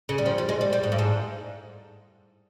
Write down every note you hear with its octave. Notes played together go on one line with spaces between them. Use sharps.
C#3
G3
F3
G3
G#3
G3
G3
G#2
G2
G#2